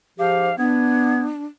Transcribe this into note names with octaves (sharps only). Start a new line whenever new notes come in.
G#2 F3 G4 C5 F5
B3 D4 G#6